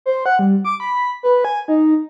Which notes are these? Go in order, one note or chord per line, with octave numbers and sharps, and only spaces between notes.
C5
F#5
G3
D6
B5
B4
G#5
D#4